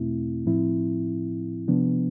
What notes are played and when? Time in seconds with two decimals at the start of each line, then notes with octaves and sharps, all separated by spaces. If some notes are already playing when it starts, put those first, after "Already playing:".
Already playing: E2 B2 A3 C4 E4
0.46 A2 F3 C4 E4
1.68 C3 F3 B3 D4